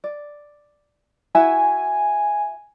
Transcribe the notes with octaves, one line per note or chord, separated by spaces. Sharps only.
D5
E4 F#4 E5 G#5